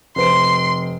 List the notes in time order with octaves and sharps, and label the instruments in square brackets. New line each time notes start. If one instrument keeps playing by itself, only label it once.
[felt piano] F1 C5 D7 [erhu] C6